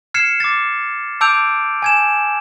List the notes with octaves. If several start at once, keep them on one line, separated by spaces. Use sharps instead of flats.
F6 G#6 C7 C#7 E7
D6 A6
A5 D6 E6 G6 D7 F7
G#5 G#6 E7